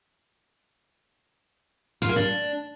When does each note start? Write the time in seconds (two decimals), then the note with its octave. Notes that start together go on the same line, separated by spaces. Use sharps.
2.02 F4
2.09 A#3
2.16 D4